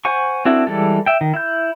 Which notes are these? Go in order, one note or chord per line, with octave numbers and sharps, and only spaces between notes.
C5 F#5 G#5 C#6
C4 D4 E4 F#4 A4
E3 G3 G#3 A4 D5
E5 G5
D#3
E4 G6